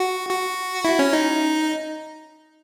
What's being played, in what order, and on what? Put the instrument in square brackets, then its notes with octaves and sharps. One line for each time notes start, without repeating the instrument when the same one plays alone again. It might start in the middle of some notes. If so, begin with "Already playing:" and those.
Already playing: [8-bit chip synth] F#4
F#4
E4
C#4
D#4